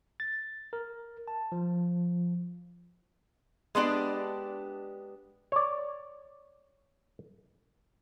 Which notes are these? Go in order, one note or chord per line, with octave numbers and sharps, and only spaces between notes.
A6
A#4
A5
F3
G#3 B3 D4 G4
C#5 D5